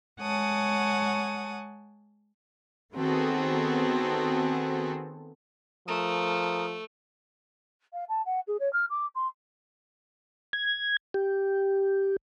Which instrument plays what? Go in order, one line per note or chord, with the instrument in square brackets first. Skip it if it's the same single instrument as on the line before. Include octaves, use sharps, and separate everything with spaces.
[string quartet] G#3 C#5 F#5 G#5 A5 D#6
[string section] D#3 B3 C4 F#4 G#4 A4
[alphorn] F3 [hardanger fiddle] A3 [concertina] A#4 D#6
[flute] F5
A5
F#5
G#4
C#5
F6
D6
C6
[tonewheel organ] G#6
G4